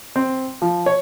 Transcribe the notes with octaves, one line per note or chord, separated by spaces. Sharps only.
C4
F3
C#5